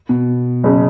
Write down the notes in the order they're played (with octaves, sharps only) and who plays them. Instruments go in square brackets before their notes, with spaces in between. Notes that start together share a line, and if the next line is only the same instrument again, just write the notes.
[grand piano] B2
[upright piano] F#1 C#3